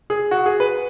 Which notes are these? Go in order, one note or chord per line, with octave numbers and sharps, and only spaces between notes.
G#4
F#4
G#4
B4